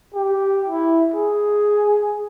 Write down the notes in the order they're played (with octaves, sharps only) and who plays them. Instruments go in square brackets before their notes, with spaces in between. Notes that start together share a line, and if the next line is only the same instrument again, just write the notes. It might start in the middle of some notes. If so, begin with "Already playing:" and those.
[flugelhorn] G4
E4
G#4